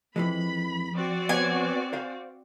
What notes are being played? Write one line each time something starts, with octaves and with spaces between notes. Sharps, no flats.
F2 E3 F3 G#3 B5
C4 F#4 D5
B3 C#5 G#5
C5 F5